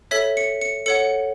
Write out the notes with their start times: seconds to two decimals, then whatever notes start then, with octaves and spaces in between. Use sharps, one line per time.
0.11 A4 C#5 E5 B6
0.37 C#7
0.61 C#7
0.86 A4 C#5 F#5 C#7